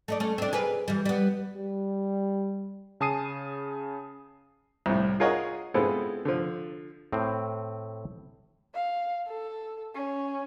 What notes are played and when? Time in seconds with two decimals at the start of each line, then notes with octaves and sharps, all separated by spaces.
0.08 A3 D#4 D5
0.20 A3 C#4
0.38 C4 D4
0.53 G#4 A#4 B4
0.88 E3 G3
1.05 G3 B3
1.56 G3
3.00 C#3 G#5 A5 D#6 C7 D#7
4.86 C2 A2
5.20 F4 G#4 A#4 C#5 D#5 F#5
5.74 G#3 B3 C4 E4 F4 A4
6.25 D3 F3
7.12 A2 C4
8.74 F5
9.27 A4
9.95 C#4